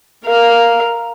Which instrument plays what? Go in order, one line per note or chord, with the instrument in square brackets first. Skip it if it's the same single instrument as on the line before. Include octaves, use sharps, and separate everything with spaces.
[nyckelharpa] A#4 F5